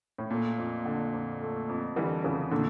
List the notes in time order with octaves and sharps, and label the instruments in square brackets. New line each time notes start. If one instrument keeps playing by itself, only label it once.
[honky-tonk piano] A2
[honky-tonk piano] A#2 [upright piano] A3
[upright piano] F2
D3
F2
A3
F2
[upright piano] D3 [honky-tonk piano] E3 G3
[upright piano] F2 [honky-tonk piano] C#3 E3
[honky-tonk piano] A#2 D3 [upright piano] A3